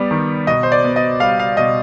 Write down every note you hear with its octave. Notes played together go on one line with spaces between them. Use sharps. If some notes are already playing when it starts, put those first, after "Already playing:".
Already playing: G3 B3 D5
D#3
B2 D#5
C5
D5
B3
D#5
G3 F5
F5
B2 D#5